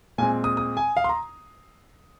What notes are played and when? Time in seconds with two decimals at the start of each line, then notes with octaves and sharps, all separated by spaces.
0.18 A#2 G#3 C4 G#5
0.44 D#6
0.57 D#6
0.77 G#5
0.97 F5
1.04 C6
1.09 A#5